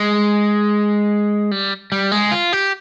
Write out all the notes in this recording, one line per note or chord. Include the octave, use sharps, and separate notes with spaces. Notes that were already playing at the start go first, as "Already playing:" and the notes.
Already playing: G#3
G3
G3
G#3
F4
G4